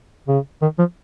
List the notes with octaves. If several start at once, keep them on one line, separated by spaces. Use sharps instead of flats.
C#3
D#3
F3